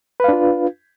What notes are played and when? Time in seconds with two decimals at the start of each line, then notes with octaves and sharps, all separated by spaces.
0.20 B4
0.24 F5
0.29 D4
0.33 F4